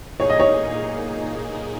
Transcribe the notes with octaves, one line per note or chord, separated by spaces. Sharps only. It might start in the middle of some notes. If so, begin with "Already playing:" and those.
A#2 A#3 D#4 G#4 C#5
D#5
C#5